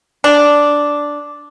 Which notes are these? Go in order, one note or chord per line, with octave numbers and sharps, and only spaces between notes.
D4